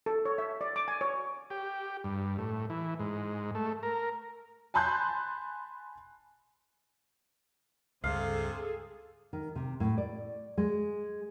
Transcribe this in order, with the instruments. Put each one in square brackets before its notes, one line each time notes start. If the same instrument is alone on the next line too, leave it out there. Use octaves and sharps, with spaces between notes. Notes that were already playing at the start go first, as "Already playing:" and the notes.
[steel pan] A4
C#5
E5
D5
D6
G#5
C#5
[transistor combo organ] G4
G2
A2
E3
G#2
A3
A#4
[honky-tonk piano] G#5 A5 B5 C6 F#6 G6
[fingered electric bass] C#2 G2 [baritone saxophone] C3 [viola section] G#4 A4 [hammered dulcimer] F5
[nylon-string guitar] D#3
C3
A2
D5
G#3